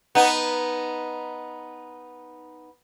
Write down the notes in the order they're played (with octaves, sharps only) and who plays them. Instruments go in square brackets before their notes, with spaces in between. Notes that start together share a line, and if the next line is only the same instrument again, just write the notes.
[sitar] B3 D#4